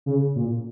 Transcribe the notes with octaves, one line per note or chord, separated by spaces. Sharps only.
C#3
A#2